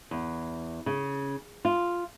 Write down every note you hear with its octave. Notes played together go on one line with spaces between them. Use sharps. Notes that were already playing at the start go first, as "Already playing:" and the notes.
E2
C#3
F4